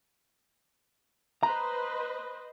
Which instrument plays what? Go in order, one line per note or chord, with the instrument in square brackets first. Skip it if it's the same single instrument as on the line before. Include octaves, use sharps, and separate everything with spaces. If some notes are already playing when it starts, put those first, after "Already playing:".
[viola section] B4 C5 D#5 [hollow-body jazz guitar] A#5